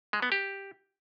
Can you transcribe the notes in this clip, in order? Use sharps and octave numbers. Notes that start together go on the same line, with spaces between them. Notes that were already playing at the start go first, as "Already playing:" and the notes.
G#3
B3
G4